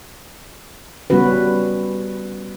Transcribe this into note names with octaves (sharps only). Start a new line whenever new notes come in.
C#3 G3 B3 C#4 F#4 B4